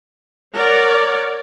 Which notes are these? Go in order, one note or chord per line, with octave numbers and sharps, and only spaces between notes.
A#4 C#5 D5 F#5